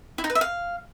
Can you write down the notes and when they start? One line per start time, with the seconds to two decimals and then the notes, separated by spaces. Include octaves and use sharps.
0.18 E4
0.24 D#4
0.30 B4
0.35 E5
0.41 F5